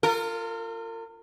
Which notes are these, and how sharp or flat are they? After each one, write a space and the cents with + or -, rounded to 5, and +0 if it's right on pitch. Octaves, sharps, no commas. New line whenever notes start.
F4 +0 A#4 -40